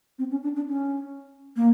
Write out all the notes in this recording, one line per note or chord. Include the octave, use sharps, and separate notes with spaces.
C4
C#4
D4
D4
C#4
A#3